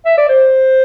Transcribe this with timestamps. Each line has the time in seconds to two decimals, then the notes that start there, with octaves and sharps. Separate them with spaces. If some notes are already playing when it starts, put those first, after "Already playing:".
0.06 E5
0.18 D5
0.29 C5